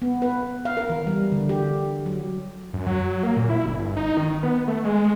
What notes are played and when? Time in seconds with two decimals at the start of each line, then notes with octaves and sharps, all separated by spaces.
0.02 B3
0.22 B4
0.65 F5
0.77 A#4
0.90 E3
1.07 G3
1.32 D3
1.49 G4
2.06 F#3
2.73 F#2
2.86 F#3
3.23 A#3
3.37 A#2
3.49 E4
3.66 G1
3.97 D#4
4.17 D#3
4.43 B3
4.68 A3
4.85 G#3